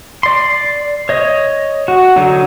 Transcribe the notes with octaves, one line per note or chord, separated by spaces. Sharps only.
D5 C6
C#5 D#5
F#4
D3 F#3 D#4